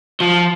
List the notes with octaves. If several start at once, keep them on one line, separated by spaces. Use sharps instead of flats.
F3